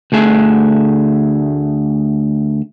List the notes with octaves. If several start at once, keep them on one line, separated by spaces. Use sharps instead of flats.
D2 A3 G#4 E5